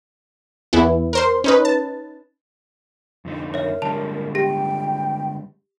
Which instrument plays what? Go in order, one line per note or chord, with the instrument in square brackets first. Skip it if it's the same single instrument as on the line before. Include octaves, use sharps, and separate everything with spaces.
[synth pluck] E2 E3 B3 E4
A#4 C5 C6
C#4 D#4 B4
A5
[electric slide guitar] F2 D3 D#4
[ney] A#4 [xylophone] C#5 E5
[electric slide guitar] D3 G3 G#3 [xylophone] A5 F7
[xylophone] G4 A#6 [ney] G5